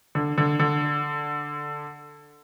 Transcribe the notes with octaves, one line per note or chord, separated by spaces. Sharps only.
D3
D3
D3